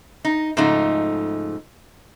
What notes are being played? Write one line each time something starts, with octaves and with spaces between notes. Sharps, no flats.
D#4
G#2 C#3 F3 A3 D#4